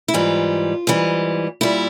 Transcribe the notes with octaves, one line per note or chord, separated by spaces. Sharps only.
E4
G#2 E3 G3 F4
G#2 E3 G3
A#2 G3 E4